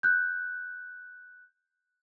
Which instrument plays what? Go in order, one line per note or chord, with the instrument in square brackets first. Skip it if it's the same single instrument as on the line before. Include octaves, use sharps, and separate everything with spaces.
[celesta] F#6 G6